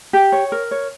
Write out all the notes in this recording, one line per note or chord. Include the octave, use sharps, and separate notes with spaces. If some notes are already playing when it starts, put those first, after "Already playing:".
G4
C#5
A#4
C#5